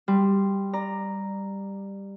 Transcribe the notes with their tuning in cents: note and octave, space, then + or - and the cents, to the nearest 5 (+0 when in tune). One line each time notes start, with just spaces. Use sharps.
G3 +5 C6 +0
D5 +20 A#5 +0